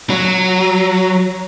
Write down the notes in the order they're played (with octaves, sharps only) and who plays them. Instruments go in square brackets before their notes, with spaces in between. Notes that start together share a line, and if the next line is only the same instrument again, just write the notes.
[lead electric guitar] F#3